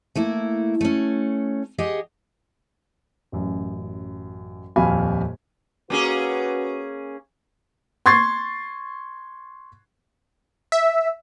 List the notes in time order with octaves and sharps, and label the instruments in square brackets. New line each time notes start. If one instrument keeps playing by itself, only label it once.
[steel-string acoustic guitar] A3 A#3 E4
A3 C#4
G4 G#4 D#5 F#5
[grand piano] A1 F#2
D#1 F2 F5 G#5 B5
[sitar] A#3 C#4 G#4 [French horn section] F#4 B4
[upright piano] C6 C#6 G#6 A6 C7
[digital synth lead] E5